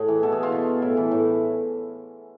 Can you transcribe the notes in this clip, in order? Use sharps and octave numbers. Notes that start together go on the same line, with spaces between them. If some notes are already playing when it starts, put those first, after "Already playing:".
Already playing: A2 G#4
E3
B2 A4
G#4
F4
B2
A2 E4
E3
A2